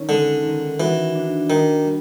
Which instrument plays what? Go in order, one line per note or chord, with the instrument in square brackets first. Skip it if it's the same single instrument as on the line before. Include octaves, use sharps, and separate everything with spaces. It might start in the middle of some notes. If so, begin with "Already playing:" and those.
Already playing: [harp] D#3 C#4
[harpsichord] D3 [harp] G#3
[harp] D#3
[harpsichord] E3 [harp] F#4
[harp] D4
[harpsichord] D#3 [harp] D4
[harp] G3